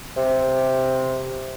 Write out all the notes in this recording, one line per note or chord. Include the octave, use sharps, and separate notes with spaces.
C3